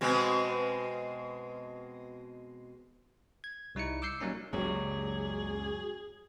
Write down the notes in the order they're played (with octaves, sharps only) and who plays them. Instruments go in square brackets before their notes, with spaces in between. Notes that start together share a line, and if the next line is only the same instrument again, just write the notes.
[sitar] B2 G#3 C4
[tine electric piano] G#6
C2 G3 D#4 E4 C#7
D6 E6 G6 C7 C#7
F#3 G3 A#3 C#4 D#4
[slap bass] F#1 C#2 A#2 [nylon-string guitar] F#3 G3 [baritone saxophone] G#4